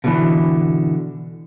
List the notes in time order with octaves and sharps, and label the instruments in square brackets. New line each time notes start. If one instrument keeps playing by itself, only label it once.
[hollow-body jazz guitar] B2 D3 E3